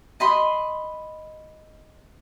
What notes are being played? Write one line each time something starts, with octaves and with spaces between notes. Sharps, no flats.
D#5 B5 C6